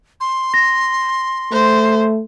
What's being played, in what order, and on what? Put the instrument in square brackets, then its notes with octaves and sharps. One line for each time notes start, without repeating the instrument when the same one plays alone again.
[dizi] C6
[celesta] A#6
[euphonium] A3 [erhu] C5